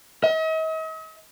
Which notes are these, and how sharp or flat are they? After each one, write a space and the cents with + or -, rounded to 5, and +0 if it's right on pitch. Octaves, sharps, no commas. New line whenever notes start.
D#5 +45